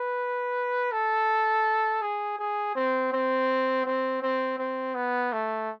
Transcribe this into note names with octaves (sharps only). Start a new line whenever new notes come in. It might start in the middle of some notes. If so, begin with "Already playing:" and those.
Already playing: B4
A4
G#4
G#4
C4
C4
C4
C4
C4
B3
A3